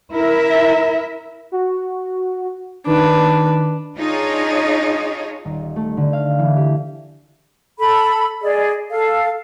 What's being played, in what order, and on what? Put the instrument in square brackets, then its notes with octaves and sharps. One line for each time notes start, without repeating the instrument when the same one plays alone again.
[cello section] E4 A#4 E5
[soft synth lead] F#4
[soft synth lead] D#3 [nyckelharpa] D4 B4
[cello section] D4 D#4 F4 G#4 C#5
[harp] D#1
A3
D3
F5
E3
G4
[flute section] A4 B5
G#4 D5 D#5
A4 F5